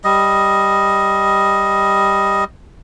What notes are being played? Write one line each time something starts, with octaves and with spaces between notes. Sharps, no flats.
G3 D#5